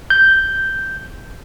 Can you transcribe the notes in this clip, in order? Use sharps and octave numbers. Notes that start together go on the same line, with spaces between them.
G6